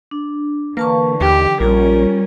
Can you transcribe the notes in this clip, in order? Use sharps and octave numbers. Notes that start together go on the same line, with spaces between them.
D4
D3 E3 A#3 B4 A5 C#6
D#2 G4 G5
A#1 G3 C#4 F4 A#4